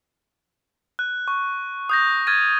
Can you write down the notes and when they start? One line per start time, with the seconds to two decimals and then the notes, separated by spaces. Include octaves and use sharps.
0.99 F#6
1.28 C#6
1.89 D#6 G6 A#6
2.27 F6 G#6 A6 D#7